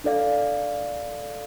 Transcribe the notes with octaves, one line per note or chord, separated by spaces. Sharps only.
D4 A4 D5 F5